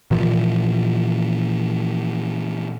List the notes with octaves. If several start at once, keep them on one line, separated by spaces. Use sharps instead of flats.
A#2 E3 F3